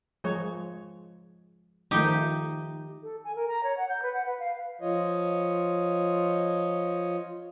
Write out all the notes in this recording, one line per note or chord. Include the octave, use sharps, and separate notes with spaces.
F3 G#3 C#5
D#3 F3 A3 D#4 G4
A4
G#5
A#4
A#5
C#5
F#5
G6
B4
F#5
B4
F5
F3 F4 C#5 D#5